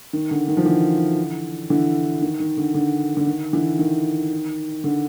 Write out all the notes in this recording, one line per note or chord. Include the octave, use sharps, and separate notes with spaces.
D#3
D3
D#3
F3
D3 E3
D3 E3
D#3
D#3
D3
D3
D3
D#3
D3 E3
D#3
D3